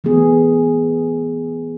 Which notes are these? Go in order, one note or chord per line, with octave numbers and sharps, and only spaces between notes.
E3 A3 B3 G#4